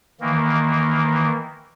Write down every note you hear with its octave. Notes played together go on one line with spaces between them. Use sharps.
D#3 E3 A#3